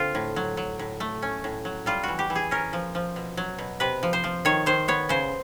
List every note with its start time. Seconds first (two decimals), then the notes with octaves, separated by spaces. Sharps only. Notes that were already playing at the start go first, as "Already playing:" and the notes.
Already playing: D3 C4 F4
0.15 A2
0.36 F#3
0.57 F#3
0.79 A2
1.00 A3
1.22 C#4
1.44 A2
1.65 F#3
1.86 G3 F4
2.03 E3 F#4
2.19 G4
2.30 E3
2.36 G#4
2.51 C#4 A#4
2.73 F3
2.95 F3
3.16 B2
3.37 F#3
3.58 B2
3.80 C3 B4
4.03 F3
4.13 C5
4.24 F3
4.45 D#3 C#5
4.66 D#3 C5
4.88 B3 C#5
5.09 C#3 C5